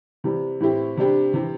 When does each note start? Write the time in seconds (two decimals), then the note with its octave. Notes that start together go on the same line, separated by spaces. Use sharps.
0.24 C3 E3 G3
0.60 A2 E3 C4 E4 G4
0.97 C3 G3 D4 G4
1.34 C3 E3 C4